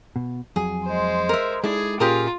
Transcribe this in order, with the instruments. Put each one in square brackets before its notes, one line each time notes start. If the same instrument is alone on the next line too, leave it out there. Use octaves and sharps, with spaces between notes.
[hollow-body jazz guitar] B2
[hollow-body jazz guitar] F2 F#3 G#5 [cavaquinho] G#4
[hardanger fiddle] G#3 C5
[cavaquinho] A#4 E5
[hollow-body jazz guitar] G#3 D#4 A4 [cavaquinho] E4 D5 [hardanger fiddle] G#4
[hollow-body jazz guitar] A#2 C#4 [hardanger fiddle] F4 [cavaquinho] G4 G#4 A#4